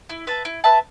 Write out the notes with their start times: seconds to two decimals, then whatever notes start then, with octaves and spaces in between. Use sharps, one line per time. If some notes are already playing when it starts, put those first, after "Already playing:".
0.10 E4
0.27 B4 E5 A5
0.45 E4
0.64 B4 E5 A5